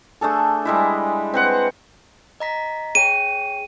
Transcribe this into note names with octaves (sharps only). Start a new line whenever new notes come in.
A3 D4 G#4 A4
G3 G#3 E4
C4 B4 F#5
D#5 A#5 B6
G#4 C#5 G5 D#7